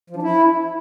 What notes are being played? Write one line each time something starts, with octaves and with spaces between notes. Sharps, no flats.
F3
D4
E4